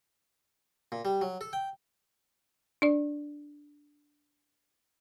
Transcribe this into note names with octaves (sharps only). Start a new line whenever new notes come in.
A#2
G3
F#3
A4
G5
D4 D5